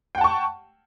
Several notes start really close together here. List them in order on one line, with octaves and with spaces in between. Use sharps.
G5 F#5 A5 C#6